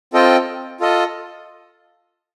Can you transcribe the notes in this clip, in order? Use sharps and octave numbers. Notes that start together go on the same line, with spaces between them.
C4 F4 A4 D#5 G5
F4 A4 D#5